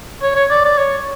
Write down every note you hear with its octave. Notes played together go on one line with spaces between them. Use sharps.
C#5
C#5
D5
D5
C#5